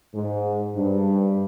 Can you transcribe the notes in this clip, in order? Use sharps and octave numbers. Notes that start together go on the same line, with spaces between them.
G#2
G2